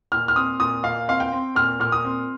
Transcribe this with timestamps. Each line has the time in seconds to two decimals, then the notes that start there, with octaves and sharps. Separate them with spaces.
0.12 A#2 F6
0.28 F6
0.36 C4 D#6
0.60 A#2 D#6
0.83 A#2 F5
1.08 C4 F5
1.20 G5
1.32 C4
1.55 A#2 F6
1.80 A#2 F6
1.92 D#6
2.04 C4